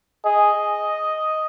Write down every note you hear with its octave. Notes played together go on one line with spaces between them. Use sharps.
G#4 D#5